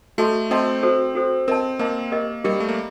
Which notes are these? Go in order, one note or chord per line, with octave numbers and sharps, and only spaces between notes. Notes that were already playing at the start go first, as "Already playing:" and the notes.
A3 F#4 A4 D#5 A5 C6
C4 F#4 A4 D#5 A5 C6
F#4 A4 C5
F#4 A4 C5
C4 A#4 D#5 A5
A#3 A#4 D#5 A5
G4 A#4 D#5
G3 G4 A#4 D#5
A3
A#3